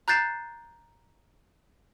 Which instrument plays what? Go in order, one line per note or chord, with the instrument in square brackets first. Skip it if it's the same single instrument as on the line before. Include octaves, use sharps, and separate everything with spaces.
[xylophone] A#5 F#6 G6 A6 C7 E7